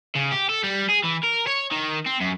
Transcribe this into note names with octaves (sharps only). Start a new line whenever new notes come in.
C#3
G4
A4
G3
G#4
E3
A#4
C#5
D#3
C4
F#2